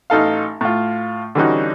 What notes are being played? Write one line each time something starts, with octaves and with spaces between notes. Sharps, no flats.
A1 D#4 A4 F5
A2 F4
D3 E3 G3 C#4 D#4 F#4